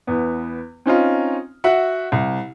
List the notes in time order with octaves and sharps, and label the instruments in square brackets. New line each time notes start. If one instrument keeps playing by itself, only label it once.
[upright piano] E2 B3
C4 C#4 D#4 F4
F#4 E5 F#5
C2